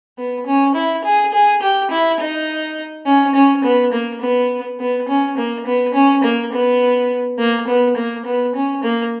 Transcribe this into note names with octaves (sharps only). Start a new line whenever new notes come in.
B3
C#4
E4
G#4
G#4
G4
E4
D#4
C#4
C#4
B3
A#3
B3
B3
C#4
A#3
B3
C#4
A#3
B3
A#3
B3
A#3
B3
C#4
A#3